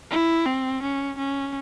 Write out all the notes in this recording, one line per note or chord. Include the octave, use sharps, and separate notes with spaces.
E4
C4
C#4
C#4